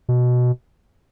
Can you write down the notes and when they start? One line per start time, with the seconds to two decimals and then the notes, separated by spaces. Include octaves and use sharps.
0.09 B2